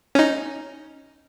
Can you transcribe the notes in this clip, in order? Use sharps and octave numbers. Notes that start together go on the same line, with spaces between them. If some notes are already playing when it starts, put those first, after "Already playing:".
C#4 D#4